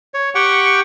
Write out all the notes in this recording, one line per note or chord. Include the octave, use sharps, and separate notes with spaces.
C#5
G4 F#5 G5 C#6